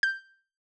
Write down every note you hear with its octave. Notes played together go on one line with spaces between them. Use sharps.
G6